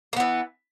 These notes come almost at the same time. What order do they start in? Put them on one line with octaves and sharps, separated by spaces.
A#3 B3 E3